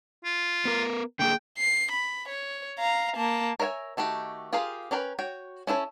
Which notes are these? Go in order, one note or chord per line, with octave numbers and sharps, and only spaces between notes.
F4
B3 A#4
D3 A#3 G#4 G5
C7
B5
C#5
F5 A#5
A#3 A5
A#4 C#5 E5 F#5 G#5
D#3 A3 F#4 G4
F4 G4 G#4 A#4 F5
C#4 D4 A#4 B4 G5
F#4 C#5 G5
C#4 E4 A4 B4 C#5